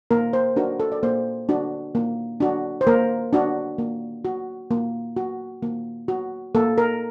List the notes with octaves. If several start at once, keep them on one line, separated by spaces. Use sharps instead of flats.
A#3 A#4
C5
D4 F#4 A#4
A4
D5
A#3 C5
D4 F#4
A#3
D4 F#4
C5
A#3 A#4
D4 F#4
A#3
F#4
A#3
F#4
A#3
F#4
A#3 A4
A#4